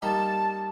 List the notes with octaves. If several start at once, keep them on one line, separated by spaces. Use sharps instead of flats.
G3 A#3 D#4 A5